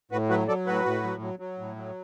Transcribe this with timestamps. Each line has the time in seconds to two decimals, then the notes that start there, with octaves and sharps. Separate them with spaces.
0.12 A2 F#4 B4
0.30 F#3 F#4 B4
0.48 F#3 A4 D5
0.66 A2 F#4 B4
0.85 A2
1.03 F#3
1.22 F#3
1.39 F#3
1.59 A2
1.76 F#3